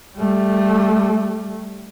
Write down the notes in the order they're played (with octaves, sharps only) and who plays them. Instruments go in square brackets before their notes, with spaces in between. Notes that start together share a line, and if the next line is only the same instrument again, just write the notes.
[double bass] G3 A3